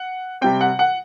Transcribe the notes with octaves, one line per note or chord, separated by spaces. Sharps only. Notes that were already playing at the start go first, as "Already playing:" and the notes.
Already playing: F#5
C3 G3 C4 G5
F#5
F#5